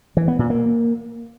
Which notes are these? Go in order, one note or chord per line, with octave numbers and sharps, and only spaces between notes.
E3
B3
A#2
A#3